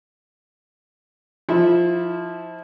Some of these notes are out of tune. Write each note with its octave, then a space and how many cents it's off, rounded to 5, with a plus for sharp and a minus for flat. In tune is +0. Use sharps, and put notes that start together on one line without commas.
F3 +0 E4 -25